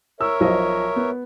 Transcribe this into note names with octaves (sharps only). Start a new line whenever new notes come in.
A#4 C#5 E5 E6
B1 F3 D#5
B3